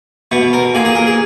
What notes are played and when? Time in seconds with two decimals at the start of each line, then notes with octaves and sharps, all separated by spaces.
0.31 B2 B3
0.53 A#4
0.75 A#2 G#4
0.85 G#4
0.95 A#4
1.07 G#4